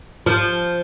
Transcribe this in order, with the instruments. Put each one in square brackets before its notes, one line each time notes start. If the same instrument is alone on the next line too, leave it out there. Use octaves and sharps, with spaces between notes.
[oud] F3